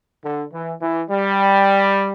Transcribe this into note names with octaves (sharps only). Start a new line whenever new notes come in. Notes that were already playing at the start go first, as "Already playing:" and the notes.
D3
E3
E3
G3